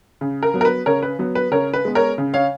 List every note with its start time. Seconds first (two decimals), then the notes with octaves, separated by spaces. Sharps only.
0.21 C#3
0.43 A#4
0.54 F#3 B3
0.61 A#4
0.65 B4
0.86 C#3 A#4 C#5
1.03 B4
1.19 F#3 B3
1.35 B4
1.51 C#3 A#4 C#5
1.74 B4
1.85 G#3 B3
1.95 A#4 C#5
2.18 C#3
2.34 C#5 F5